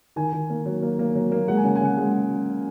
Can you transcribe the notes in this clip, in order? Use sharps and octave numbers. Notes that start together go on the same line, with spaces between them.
D#3 G#5
D#3
A#3
F#3
A#3
A#3
F#3
A#3
G#3 F#5
G#5
C#3 F#5
G#5
C#3 F#5
G#3